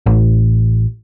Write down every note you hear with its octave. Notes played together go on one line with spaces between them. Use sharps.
A1